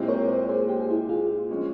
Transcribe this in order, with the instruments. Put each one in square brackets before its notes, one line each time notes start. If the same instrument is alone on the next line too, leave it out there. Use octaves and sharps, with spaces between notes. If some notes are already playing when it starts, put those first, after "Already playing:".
Already playing: [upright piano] A#2 G#3 C4 E4 G4
[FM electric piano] A#4 C#5
C5
C#5
G#4 C5
G4
G#4
E4 G4
F4 G#4
[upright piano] F3 G#3 C#4